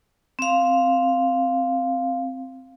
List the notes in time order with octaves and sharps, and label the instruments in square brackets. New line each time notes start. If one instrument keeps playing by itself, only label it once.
[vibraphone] C4 F5